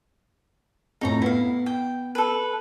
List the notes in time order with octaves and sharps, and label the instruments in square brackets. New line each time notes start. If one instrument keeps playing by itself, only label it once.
[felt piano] F2 A2 [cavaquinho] D#4 C#5 A#5
[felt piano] B3 [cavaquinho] E4 F5
[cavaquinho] G5
A4 B4